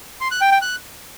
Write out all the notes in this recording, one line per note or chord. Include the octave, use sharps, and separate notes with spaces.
C6
F#6
G5
G5
F#6